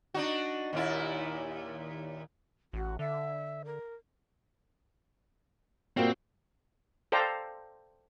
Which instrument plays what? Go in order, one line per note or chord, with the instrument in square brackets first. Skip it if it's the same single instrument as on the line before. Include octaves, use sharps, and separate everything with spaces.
[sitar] D4 D#4 F#4
D#2 A#2 E4
[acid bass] A1 [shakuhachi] F#4
[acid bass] D3 [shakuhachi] E5
[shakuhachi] A#4
[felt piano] A#2 F#4 [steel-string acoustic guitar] G3 A#3 [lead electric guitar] C4
[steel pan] A4 C5 D5 F5 G5 A#5